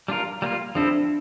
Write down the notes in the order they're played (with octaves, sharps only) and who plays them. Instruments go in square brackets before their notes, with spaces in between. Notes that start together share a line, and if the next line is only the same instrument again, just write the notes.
[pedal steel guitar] G3 D4 F4 A#4
G3 A#3 F4
[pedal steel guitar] F3 C4 E4 A4 [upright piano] D4